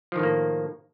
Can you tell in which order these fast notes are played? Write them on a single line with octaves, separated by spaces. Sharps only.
F3 D#3 A2 A#3